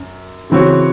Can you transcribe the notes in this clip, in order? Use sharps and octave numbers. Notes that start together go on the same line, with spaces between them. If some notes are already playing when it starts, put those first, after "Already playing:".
Already playing: F#2
C#3 E3 C4 F#4 C#5